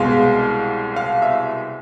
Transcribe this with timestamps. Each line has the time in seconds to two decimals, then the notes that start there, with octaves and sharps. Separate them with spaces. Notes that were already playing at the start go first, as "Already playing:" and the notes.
Already playing: C2 B2 G#3 F5
0.96 F5
1.22 E5